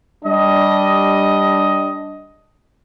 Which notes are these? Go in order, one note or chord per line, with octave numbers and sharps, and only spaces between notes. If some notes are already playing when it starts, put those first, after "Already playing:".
G3 D4 D#5